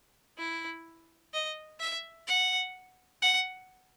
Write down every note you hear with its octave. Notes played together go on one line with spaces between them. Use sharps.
E4
D#5
E5
F#5
F#5